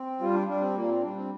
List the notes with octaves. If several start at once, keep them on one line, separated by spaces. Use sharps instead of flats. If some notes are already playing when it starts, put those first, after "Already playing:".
Already playing: C4
G3 F4
D4
G3 D4
C4
A#2 A#3
C4
G3 D4
C4